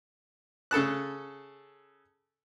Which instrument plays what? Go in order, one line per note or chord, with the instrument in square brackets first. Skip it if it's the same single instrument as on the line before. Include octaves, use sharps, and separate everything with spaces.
[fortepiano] C#3 A4 A5 F#6